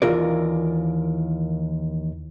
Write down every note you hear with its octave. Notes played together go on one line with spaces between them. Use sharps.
D#2 E3 F4 A#4 D5